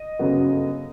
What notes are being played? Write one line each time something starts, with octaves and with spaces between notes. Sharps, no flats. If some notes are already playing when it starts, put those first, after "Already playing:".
Already playing: D#5
G1 F#2 C#3 F#3 B3